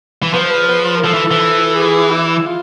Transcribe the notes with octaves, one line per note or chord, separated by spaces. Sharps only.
E3
F3 B4
C5
B4
B4
A#4
F3 A4
E3
E3
G#4
E4
F4